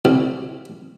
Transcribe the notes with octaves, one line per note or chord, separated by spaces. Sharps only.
C2